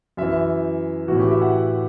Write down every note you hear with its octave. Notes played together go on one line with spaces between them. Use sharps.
F#2 E3 E5
A2 E3 F#4
G4
E5
F#5